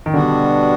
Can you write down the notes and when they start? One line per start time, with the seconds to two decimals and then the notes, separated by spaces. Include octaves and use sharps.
0.06 D#3
0.13 B2 D3 G3 B3 D4 F#4